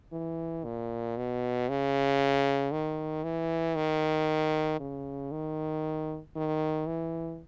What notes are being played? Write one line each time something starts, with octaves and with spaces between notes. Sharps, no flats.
E3
A#2
B2
C#3
D#3
E3
D#3
C#3
D#3
D#3
E3